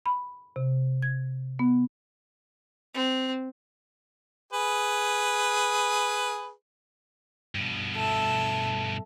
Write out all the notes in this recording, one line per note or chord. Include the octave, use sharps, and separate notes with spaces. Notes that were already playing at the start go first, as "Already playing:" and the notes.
B5
C3
G#6
B3
C4
G#4 B4
G2 B2
A4 E5